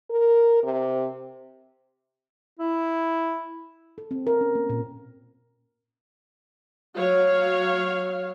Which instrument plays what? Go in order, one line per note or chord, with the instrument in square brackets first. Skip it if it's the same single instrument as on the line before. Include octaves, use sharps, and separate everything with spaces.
[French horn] A#4
C3
[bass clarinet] E4
[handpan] A4
C4
A#4
C#4
A#3
A#2
[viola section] F#3 C#5 F5